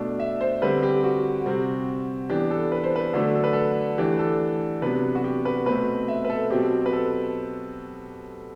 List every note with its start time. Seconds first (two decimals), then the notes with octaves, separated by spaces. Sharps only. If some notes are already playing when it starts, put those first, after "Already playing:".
Already playing: B2 A3 D4
0.20 E5
0.41 C5
0.62 D3 G3 C4 B4
0.83 G4
1.04 F#4
1.46 C3 G3 C4
2.29 E3 B3 D4 G4
2.51 A4
2.72 B4
2.84 C5
2.96 B4
3.13 D3 F#3 A3 D4 A4
3.35 A4
3.44 B4
3.53 A4
3.98 E3 A3 D4 G4
4.19 A4
4.82 C3 F#3 B3 D4 B4
5.15 F#4
5.24 G4
5.45 B4
5.66 B2 A3 C4 B4
6.08 E5
6.25 B4
6.30 A4
6.50 B2 F#3 C4 G4
6.86 B4
6.93 A4